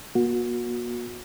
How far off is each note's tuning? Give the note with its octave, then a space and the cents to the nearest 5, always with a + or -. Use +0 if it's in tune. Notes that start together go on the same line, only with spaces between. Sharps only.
A#3 +45 F#4 -30